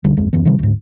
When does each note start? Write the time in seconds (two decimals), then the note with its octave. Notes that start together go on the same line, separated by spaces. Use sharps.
0.04 F1 C#2 D3 G3
0.17 D1 G#1 F2 G#3
0.33 D1 F#2 E3 B3
0.45 C3 D#3 E3 G3
0.59 D2 G#2